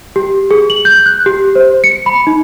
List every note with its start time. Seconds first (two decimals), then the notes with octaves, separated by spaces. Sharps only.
0.16 G4
0.51 G#4
0.70 F#7
0.85 G6
1.06 F#6
1.26 G4
1.55 C5
1.84 C#7
2.06 B5
2.27 D#4